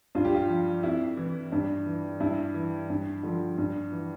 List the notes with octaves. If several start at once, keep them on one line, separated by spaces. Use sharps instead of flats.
G2 F4
G4
F4
F3
F2 E4
E3
G2
E3
G2 E4
E3
G2
D3 F3
G2
E3